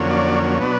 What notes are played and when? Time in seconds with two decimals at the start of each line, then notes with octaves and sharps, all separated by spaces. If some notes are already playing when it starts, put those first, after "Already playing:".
Already playing: F2 D3 F#3 A#3 C#4
0.10 D5
0.59 B2 F#3 B3 D4